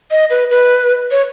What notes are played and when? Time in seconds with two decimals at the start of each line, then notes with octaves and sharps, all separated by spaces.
0.11 D#5
0.30 B4
0.50 B4
1.11 C#5